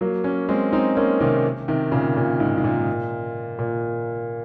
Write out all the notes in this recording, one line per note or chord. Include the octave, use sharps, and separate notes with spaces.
F#3 A#3
A#3 C#4
G#3 C4
C4 D#4
A#3 C#4
C3 D#3
C3 D#3
A#2 C#3
A#2
G#2
G#2
A#2
A#2